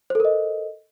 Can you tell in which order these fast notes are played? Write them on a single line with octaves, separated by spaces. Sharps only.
C5 A4 A#4 D#5